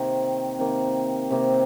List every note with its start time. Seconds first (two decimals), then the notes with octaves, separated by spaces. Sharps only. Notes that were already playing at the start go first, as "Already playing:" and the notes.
Already playing: C3 D#3 A#3
0.59 C3 D#3 A#3
1.30 C3 D#3 A#3